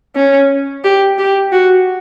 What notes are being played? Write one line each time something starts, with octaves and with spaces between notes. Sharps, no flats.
C#4
G4
G4
F#4